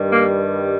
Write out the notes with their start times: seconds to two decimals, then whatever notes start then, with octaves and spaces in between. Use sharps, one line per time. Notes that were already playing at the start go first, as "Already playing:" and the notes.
Already playing: G2 D#3 G3
0.09 A#3